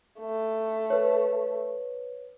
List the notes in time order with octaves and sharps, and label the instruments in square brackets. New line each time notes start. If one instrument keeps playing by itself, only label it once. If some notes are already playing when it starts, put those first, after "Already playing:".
[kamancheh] A3
[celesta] B4 C#5